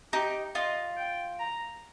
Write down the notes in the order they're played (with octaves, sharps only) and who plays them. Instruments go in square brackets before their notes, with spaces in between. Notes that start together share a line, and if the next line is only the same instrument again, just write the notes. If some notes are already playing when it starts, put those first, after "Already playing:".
[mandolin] D#4 [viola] G4
[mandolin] F4 [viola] D#5
[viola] G5
A#5